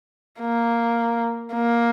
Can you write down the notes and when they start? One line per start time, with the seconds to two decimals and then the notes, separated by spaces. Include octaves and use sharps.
0.40 A#3
1.54 A#3